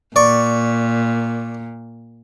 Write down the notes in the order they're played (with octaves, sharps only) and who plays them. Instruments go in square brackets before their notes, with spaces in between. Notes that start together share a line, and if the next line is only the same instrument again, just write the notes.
[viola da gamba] A#2 [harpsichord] D5 C#6